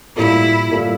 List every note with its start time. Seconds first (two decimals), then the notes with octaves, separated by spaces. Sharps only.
0.17 A2 G3 A#3 E4 F4 A4
0.69 A2 G3 A#3 F4 A4